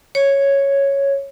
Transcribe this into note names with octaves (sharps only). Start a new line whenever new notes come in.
C#5